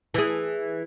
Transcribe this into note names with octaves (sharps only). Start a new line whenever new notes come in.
E3 G#4